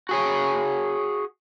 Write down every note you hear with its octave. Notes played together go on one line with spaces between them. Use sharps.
F#4 G#4 C#5